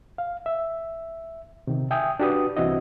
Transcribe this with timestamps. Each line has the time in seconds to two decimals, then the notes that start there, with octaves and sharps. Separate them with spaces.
0.18 F5
0.46 E5
1.67 C3 D#3
1.91 E5 G5 G#5 D#6
2.20 D4 F#4 G4 B4 D#6
2.57 C2 E3 C4 E4 F#4 D#5